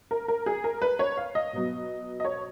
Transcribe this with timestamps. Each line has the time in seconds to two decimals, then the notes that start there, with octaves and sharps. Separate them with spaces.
0.11 A#4
0.28 A#4
0.46 G#4
0.64 A#4
0.82 B4
0.99 C#5
1.17 F5
1.35 D#5
1.53 B2 F#3 B3
2.20 D#5
2.25 C#5